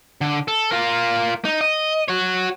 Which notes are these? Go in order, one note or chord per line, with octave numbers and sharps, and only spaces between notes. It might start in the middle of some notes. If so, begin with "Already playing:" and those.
D3
A4
F4 A#4
D#4
D#5
F#4 C#5